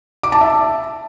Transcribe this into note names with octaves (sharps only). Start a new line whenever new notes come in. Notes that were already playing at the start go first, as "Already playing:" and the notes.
D6
A5
E5